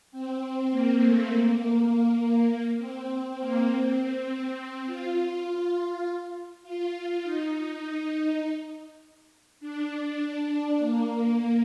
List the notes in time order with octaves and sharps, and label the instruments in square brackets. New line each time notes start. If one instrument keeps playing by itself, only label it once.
[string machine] C4
A#3
A3
A#3
A#3
C4
C4
A#3
C4
F4
F4
F4
D#4
D#4
D4
A#3